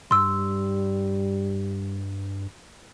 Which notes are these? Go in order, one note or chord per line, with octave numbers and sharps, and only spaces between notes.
G2 G3 C6 E6